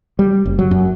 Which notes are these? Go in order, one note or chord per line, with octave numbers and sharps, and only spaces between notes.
G3
F#1
F#3
F#2